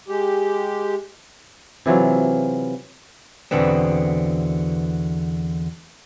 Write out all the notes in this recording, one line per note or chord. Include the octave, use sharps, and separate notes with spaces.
G#3 G4
C3 E3 F#3 F4
E2 B2 D3 B3 C4